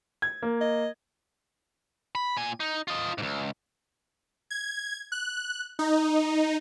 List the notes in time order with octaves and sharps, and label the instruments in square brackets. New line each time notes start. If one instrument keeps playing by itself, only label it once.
[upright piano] G#6
A#3
[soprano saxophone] D#5
[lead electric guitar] B5
A#2 G#5
D#4
F4 D#5
C#2 G#2
[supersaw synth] G#6
F#6
D#4